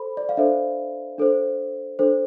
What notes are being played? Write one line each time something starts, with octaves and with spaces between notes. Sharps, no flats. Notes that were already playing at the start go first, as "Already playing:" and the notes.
Already playing: A4 C5 B5
D5
F5
D4 A4 C5 E5
D4 A4 C5
D4 A4 C5